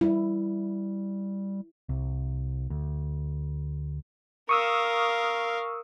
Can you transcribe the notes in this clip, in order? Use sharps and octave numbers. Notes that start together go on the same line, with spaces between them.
G3 E4
C2
D2
A#4 F5 C#6 D#6 E6